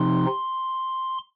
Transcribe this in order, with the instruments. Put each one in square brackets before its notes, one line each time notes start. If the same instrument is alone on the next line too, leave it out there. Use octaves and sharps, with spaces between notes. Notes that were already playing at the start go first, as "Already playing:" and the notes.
Already playing: [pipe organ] C3 F3 C4 D#4 C6